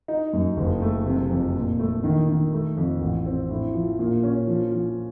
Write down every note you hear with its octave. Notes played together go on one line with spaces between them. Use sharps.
D#4
F#2
F#1
A3
C3
F2
A#2
A3
D#3
D#3
A3
F2
A1
C4
A2
F3
A#2
C#4
F3
F3